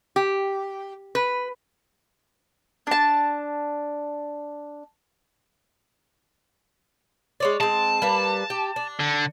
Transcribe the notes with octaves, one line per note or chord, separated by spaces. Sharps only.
G4
B4
D4 A5
G#3 C#5 D5
G#3 C4 A5
G3 A#3 B4
G4
D4
D3